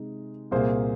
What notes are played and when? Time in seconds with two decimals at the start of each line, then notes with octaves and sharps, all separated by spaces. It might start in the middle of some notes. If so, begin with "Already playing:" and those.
Already playing: C3 G#3 D#4
0.51 C2 A#2 A#3 G#4 C5